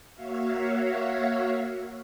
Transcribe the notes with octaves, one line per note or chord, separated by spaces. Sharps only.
A#3 F#4 C#5 E5 F5